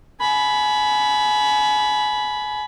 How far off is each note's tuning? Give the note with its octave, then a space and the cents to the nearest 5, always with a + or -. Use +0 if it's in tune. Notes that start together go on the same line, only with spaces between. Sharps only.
G#5 +30 B5 +0